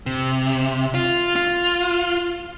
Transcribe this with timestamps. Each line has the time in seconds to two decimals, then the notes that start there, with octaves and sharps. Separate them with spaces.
0.06 C3
0.94 F4
1.36 F4